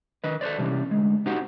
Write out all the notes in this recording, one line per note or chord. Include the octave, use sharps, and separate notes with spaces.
D#3 B4 D#5
A4 B4 C5 D5
C3 E3 G3 C4 C#4
D2 G#3
C4 D#4 F#4 G4 C5